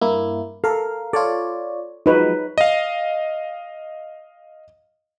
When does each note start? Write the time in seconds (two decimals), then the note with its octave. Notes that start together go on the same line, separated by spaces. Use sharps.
0.01 G2 A#3 E4
0.64 A4 A#4 F5
1.13 F4 A4 C#5 D5
2.06 F3 F#3 G#3 D#4 B4 C#5
2.58 D#5 F5